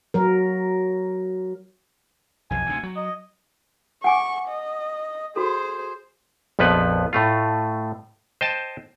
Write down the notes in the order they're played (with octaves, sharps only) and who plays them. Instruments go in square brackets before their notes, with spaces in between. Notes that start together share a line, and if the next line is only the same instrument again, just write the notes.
[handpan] F#3 A#4
[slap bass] B1 F2 [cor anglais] G#5
[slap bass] D2 C3
F#3
[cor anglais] D#5
[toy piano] F#5 G#5 D6 [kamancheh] C#6
[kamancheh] D#5
[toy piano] F#4 A4 [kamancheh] G#4 C5
[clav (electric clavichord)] A#1 F2 F3 B3 B4
A2 A3 F4
C5 D#5 G5 A5